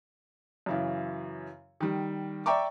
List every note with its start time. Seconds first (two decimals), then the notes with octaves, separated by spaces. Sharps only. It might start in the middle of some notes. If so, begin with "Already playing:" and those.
0.66 F#2 C#3 E3
1.80 D#3 G3
2.46 D5 E5 G5 A#5 C#6 D6